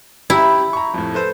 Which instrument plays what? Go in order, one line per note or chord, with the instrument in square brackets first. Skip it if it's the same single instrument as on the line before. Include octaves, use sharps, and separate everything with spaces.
[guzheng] E4 [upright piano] G4 A#5 B5
[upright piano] A#5 C#6
F2 A2
A4 B4 C5